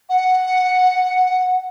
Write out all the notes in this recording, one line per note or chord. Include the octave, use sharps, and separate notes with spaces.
F#5